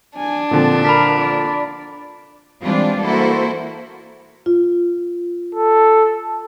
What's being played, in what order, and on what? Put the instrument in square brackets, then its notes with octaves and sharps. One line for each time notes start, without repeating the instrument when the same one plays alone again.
[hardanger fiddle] D4 [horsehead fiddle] G#5
[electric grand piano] A#2 D3 F3 [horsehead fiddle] C4 A5
[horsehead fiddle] A#4 [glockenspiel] B5 B6
[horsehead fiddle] D5
[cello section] E3 G3 G#3 C4 D4 F4
A#3 E4 F#4 A4 C5
[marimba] F4
[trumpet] A4